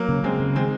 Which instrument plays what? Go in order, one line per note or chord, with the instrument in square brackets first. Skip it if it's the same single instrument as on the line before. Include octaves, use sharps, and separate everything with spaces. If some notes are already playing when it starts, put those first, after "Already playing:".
Already playing: [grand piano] F#3 A#3
[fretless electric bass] C#3
[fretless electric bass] C#3 [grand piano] G#3 C4
[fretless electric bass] C#3
[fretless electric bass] D#3 [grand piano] G#3 C4